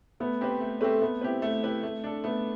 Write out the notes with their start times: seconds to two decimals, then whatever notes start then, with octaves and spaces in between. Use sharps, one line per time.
0.20 A3 B3
0.41 C4 G4 B4
0.60 A3
0.81 A3 C4 G4 B4
1.01 A3 B3
1.21 C4 E4 G4 B4
1.42 A3
1.63 E4 G4 B4
1.83 A3
2.04 D4 A4
2.24 A3 B3